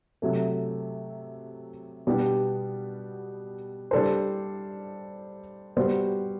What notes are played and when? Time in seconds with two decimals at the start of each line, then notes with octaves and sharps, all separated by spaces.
0.22 C3 F#3 A3
2.07 B2 G3 B3 D4 G4
3.91 G3 D4 A4 C5
5.77 G3 B3 F#4 C5